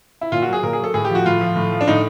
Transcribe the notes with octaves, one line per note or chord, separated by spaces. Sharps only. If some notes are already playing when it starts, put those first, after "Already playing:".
E4
A#2 F4
F#3 F#4
G#4
A#2 A#4
G#4
F#3 A4
A2 G#4
G4
F3
F#4
A2 F4
F3
A2
F3
D4
A2 D#4